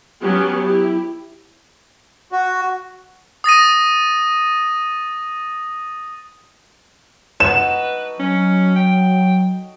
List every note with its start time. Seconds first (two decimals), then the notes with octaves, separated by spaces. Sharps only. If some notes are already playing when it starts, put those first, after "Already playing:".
0.21 F#3 B3 C#4 G4
0.65 E4 G4
2.32 F#4
3.44 D#6 A6 A#6 D#7
7.40 D#4 F#4 A4 B4 E7
8.20 F#3 C#4
8.76 G5